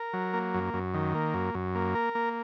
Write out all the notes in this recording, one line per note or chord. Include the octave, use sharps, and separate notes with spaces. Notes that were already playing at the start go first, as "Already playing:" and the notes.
Already playing: A#4
F#3
A#3
F#2
F#2
D#3
A#3
F#2
F#2
A#3
A#4
A#3